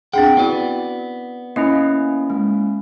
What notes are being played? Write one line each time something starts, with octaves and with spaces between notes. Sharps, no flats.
C4 D4 G#4 F#5 G5
B3 E4 F#4 D5
A#3 C#4 E4 D#5
G#3